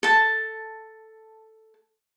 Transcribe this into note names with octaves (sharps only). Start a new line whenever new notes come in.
A4 A5